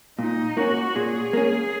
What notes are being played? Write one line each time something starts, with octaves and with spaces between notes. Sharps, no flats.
A#2 D#4
A#3 C#4 F#4
A#2 G#4
A#3 C#4